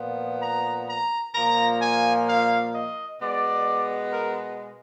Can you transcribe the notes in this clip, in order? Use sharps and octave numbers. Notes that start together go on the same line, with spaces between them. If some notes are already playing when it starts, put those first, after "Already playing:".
Already playing: A#2 F3 B3
A#5
A#5
A#2 F3 A#3 A#5
G#5
F5
D#5
B2 G#3 B3 D5
A#4